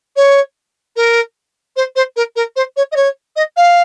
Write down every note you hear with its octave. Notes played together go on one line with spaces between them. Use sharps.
C#5
A#4
C5
C5
A#4
A#4
C5
C#5
D#5
C#5
D#5
F5